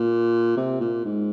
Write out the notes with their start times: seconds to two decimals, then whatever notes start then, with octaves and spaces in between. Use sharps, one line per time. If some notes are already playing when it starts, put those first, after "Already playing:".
Already playing: A#2
0.57 C3
0.81 A#2
1.05 G#2